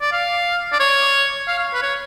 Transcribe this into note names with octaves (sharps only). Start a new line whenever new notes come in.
D5
F5
D5
C#5
F5
F5
B4
C#5